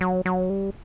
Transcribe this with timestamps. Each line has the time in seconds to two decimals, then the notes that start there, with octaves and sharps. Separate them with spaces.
0.01 F#3
0.26 F#3
0.50 G3